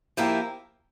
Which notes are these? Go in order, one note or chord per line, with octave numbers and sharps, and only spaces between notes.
F3 A#3 E4 G4